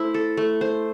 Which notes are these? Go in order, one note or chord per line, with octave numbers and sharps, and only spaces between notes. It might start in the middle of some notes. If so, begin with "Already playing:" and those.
Already playing: A3 E4 C5
A4
A3
C5